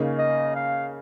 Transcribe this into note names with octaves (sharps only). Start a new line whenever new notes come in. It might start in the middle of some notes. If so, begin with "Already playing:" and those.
Already playing: C#3 A#3 D#4 G#4
D#5
F5